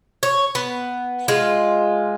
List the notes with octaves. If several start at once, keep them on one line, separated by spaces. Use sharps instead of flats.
C#5
B3
G#3 F4